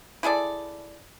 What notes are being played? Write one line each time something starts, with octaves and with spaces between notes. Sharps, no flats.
E4 G#4 A4 D5